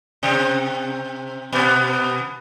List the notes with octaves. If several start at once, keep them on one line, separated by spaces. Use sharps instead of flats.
C3 C4
B2 B3